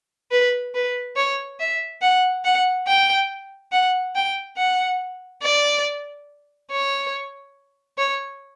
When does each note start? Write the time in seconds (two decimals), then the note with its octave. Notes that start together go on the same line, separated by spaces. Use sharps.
0.32 B4
0.75 B4
1.17 C#5
1.60 E5
2.02 F#5
2.45 F#5
2.87 G5
3.72 F#5
4.15 G5
4.58 F#5
5.43 D5
6.71 C#5
7.98 C#5